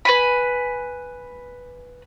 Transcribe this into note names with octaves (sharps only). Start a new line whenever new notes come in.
B4 G#5 B5